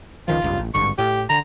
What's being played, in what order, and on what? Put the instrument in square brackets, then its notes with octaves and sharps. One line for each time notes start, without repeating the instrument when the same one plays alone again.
[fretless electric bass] C#2 D#3 F3 [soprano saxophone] F4
[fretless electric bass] F1 C#2 G2
A1
[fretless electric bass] G#1 G2 D3 [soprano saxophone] C#6
[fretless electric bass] A2 [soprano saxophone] G4
[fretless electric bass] D3 [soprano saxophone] A#5